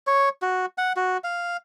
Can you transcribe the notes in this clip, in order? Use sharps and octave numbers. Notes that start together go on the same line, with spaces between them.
C#5
F#4
F#5
F#4
F5